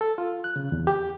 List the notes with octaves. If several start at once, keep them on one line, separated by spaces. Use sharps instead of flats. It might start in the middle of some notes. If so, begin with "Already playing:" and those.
A4
F4
F#6
C#3
E2
G4